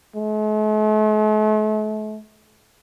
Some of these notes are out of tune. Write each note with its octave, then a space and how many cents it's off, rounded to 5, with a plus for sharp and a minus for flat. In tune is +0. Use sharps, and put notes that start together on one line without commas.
A3 -45